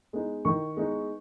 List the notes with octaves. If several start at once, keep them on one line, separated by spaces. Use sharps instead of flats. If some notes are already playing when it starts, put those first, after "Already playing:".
G#3 B3 D#4
D#3 C#6
G#3 B3 D#4